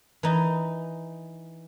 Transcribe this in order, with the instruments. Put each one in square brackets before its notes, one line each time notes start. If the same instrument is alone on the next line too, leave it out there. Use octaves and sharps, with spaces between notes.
[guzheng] E3 D#4